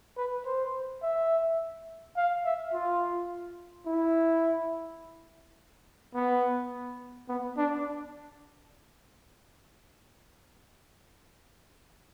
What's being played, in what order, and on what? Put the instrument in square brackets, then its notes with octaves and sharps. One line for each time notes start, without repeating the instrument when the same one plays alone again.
[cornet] B4
C5
E5
F5
E5
F4
E4
B3
B3
D4